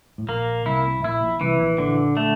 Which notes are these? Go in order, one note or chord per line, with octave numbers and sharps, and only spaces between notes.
A2
A#1 A#2 A#3
C2 C3 E4
A2
A#1 A#2 E4
A#1 A#2
C2 C3 E3
A#1 A#2
A#1 A#2 D3
A3